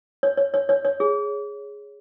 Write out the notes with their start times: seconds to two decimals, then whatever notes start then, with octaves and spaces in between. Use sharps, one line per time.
0.23 C#5
0.37 C#5
0.54 C#5
0.69 C#5
0.85 C#5
1.00 G#4